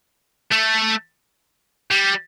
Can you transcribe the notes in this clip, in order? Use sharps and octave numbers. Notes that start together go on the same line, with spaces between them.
A3
G3